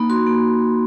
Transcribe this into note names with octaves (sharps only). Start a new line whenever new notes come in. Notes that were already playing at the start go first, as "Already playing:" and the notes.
Already playing: A#3 D#4 B5
F#4 C6
A#3